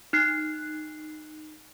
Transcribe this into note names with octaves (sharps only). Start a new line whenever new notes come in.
D#4 F#6 C7